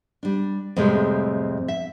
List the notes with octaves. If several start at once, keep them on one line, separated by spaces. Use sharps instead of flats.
G3 D4
F2 A2 C3 G3 G#3 C4
E5